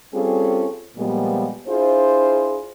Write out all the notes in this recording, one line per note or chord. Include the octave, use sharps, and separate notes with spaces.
G3 C4 C#4 F4 G#4 A4
A#2 F3 G3 G#3 B3
D4 E4 F4 G#4 C5